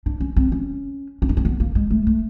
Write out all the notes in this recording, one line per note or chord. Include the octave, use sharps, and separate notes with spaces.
D4
C#4
C4
C#4
C#4
D4
C4
B3
A#3
G#3
A3
A3